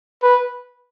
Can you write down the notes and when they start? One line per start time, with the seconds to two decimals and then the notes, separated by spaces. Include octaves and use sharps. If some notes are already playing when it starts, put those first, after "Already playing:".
0.23 B4